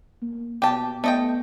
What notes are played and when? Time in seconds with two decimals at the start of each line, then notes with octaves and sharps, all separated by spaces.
0.22 A#3
0.62 B2 G4 A5
1.04 A3 B3 D#5 G5